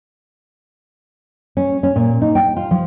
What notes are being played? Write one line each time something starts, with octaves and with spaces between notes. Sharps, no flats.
C#4
C#4
A#2
D#4
G5
F4
F3